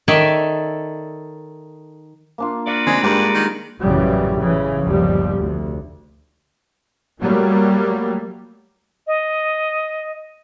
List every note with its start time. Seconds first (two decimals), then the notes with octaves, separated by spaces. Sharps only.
0.08 D#3 A4 C#5 D5 E5 A5
2.38 A#3 D4 F4
2.67 F#4 B4 D5 F5
2.87 D2 G#3 C4 D4 D#4
3.03 G2 G3 G#3 D4 A#4
3.34 D#3
3.81 A1 F#2 A#2 C#3 E3 G3
4.37 C#3 E3
4.82 G1 D#2 F3 G3
5.36 F1 D2
7.20 F#3 G3 A3 A#3
9.07 D#5